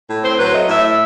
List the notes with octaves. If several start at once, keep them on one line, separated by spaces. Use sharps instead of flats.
A2
C4 C5
F#3 B4
C5
A3 D#5
A2 E5
E5